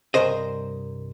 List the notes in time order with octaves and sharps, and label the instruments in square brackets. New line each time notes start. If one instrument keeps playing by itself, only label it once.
[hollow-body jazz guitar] C2 G2 A#4 C5 D#5